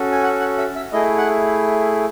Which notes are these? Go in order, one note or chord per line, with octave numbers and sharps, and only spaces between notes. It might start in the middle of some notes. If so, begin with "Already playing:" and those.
Already playing: C#4 F#4 A4
G#5
F#5
F#5
E5
E5
A3 E4 G#4 D#5
F#5